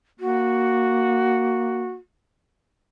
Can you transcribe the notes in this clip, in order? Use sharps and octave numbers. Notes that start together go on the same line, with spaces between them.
A#3 F#4